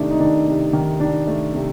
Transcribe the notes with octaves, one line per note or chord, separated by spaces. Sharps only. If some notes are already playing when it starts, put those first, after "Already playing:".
Already playing: C3 D#3 A3 D4 D#4
D#4
D#3 D4
C3
D#3
D#3 D4
A3
C3